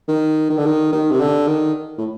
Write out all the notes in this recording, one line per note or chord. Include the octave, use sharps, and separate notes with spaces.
D#3
D#3
D3
D#3
D#3
C3
D3
D#3
A2